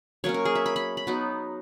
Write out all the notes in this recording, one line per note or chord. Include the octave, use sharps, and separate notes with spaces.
F#3 A#3 C#4 C#5
A#4
G#4
E5
B5
B5
B5
F#3 B3 D#4